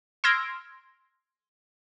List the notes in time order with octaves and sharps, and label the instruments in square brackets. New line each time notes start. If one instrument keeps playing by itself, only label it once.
[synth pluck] C6 E6 F6 G#6 A#6 D7